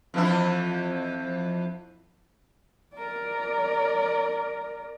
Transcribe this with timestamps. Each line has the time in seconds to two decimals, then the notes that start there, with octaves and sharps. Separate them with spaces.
0.14 F2 E3 E4
2.94 A#4 D5